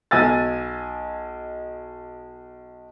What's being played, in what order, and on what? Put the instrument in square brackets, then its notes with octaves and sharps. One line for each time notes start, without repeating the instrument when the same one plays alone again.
[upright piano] B1 D#5 G#5 E6 A6